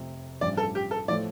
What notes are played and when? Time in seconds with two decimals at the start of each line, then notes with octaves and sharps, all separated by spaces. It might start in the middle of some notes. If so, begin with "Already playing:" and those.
Already playing: F1 F2 C3
0.41 A1 G2 F3 D5
0.57 A4
0.75 G4
0.91 A4
1.08 A2 F3 A3 D5